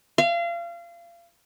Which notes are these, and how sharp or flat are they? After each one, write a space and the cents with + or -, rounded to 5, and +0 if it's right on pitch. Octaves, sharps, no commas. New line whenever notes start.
F5 -30